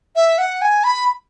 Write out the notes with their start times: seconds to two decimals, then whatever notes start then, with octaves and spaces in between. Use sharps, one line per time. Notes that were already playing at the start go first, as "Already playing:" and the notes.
0.16 E5
0.38 F#5
0.62 G#5
0.84 B5